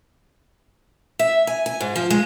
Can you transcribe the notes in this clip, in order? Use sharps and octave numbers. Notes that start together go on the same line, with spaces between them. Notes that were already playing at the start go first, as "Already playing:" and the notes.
E5
G#5
G#5
G#2
F3
G#3